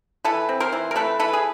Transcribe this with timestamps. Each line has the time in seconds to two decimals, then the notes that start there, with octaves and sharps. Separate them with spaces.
0.25 E3 A4 B4
0.49 C4
0.60 A#4 C5
0.72 E3
0.91 A#4
0.96 A3 A4 B4
1.19 E3 A4 B4
1.33 G#4